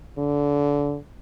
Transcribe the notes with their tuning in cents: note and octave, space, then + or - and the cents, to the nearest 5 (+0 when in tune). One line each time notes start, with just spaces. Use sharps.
D3 -25